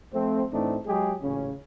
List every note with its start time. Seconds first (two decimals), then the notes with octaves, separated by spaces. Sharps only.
0.12 F3 A3 C4
0.53 A2 E3 A3 C4 D4 D#4
0.87 F#3 G#3 G4 G#4
1.22 A1 A#2 C#3 C#4